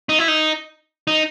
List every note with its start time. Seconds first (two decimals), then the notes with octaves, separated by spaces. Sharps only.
0.09 D#4
0.19 E4
0.28 D#4
1.07 D#4